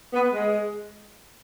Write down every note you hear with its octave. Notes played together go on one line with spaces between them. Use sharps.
B3
G#3